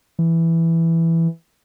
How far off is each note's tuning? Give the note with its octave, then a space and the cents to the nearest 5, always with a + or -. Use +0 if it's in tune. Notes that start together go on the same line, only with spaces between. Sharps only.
E3 +5